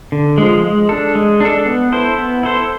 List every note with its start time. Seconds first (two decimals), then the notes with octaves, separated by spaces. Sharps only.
0.12 D3
0.38 F3 G#3
0.64 G#3
0.89 D4 A4
1.15 G#3
1.40 D4 A4
1.66 B3
1.92 E4 A4 C5
2.18 B3
2.43 E4 A4 C5